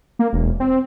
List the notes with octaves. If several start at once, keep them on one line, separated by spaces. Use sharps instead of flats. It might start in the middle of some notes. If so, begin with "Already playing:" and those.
A#3
E1
C4